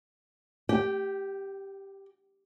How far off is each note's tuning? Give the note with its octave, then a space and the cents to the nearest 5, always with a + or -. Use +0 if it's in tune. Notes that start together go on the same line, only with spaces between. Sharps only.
G4 +0 G5 -35